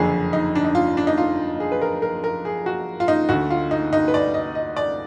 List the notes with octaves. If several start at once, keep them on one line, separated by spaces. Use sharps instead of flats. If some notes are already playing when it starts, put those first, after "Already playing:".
Already playing: F#1 F2 D3 G#4
D#4
D4
D#4
F4
D4
D#4
F4
G#4
B4
A#4
A#4
A#4
G#4
F#4
F4
D#4
D2 D3 F#4
F4
D#4
D#4
B4
D5
D#5
D#5
D5